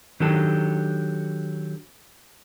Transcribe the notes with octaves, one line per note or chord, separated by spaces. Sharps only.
D#3 F#3 D4 G4 A4 A5